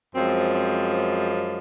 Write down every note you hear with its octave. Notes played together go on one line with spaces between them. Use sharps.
F#2 F3 G#3 C4
C4
C4